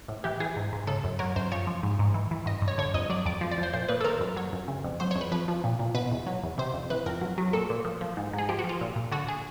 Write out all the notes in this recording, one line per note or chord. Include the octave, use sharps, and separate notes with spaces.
A2
E3 G4
E3 G#4
G#2
G#2
C#3 A4
F#2
F#3 A#4
F#2 C5
F3 C#5
F3
G#2
G#2
E3
E3
G2 D#5
G2
C#5
D3 C#5
F2 D#5
F#3 D5
F2 D5
F3
D5
F3
C5
A#2 C5
A#2 B4
A4
D#3 A#4
F#2
F#3 C#5
F#2
C#3
F2
F#3 C5
F2 C#5
B4
F3 B4
F3
A#2
A#2
B2 B4
E2
F#3
E2
C3 C5
F2
E3 B4
F2 A#4
F#3
F#3
A#2 A4
A#2
F3
F3
G#2
G#2 G#4
F3 G4
F#4
F3
F4
A#2
A#2
D3 F#4
G#4